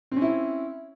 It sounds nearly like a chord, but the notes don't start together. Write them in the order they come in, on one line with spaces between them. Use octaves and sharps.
C4 C#4 E4